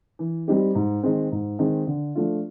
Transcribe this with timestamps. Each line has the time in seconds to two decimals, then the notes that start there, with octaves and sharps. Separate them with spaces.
0.19 E3
0.48 G3 C4 D#4 G4
0.75 G#2
1.03 D#3 G#3 C4
1.32 G#2
1.59 D#3 G#3 C4
1.87 D3
2.15 F3 A3 D4 F4